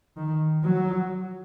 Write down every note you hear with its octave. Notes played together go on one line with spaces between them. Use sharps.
D#3
F#3